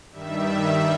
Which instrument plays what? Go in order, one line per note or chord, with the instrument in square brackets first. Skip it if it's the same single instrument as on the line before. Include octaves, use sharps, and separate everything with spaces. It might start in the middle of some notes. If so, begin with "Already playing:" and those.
[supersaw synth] G2 D#3 G3 E5